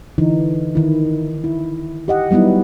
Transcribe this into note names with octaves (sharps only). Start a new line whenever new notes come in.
D3 E3 D#4
D#3 E4
E4
G4 D#5 F#5
F#3 G3 B3 D#4 E4